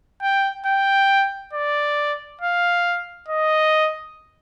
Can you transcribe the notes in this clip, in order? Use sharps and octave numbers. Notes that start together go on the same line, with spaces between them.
G5
G5
D5
F5
D#5